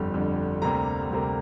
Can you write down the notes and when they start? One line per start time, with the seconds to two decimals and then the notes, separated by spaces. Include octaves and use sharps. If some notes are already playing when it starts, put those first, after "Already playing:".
Already playing: G1 F2 D3 G3
0.14 G1 F2 D3 G3
0.62 D2 C3 G3 A#3 A#5
1.11 D2 C3 G3 A#3